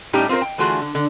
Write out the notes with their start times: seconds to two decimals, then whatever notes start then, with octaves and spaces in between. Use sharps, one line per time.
0.13 A2 G3 C#4 D#4 G4 G5
0.29 C4 F4 G#4 A#4 C5
0.42 G5
0.58 D3 E3 A3 F4 F#4 G#4
0.82 D3
0.95 D3